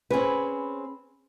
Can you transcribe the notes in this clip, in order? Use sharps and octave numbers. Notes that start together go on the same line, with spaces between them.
C4 C#4 G#4 B4